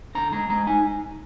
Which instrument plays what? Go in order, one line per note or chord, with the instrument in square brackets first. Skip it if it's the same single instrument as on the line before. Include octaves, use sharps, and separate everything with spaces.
[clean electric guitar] D3 A#5
G#3 A#5
G#3 A#5
D#4 G#5